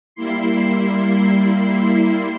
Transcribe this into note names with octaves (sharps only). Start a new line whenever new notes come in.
G3 A#3 E4 C6 C7